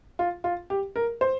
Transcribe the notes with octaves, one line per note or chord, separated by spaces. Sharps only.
F4
F4
G4
A#4
C5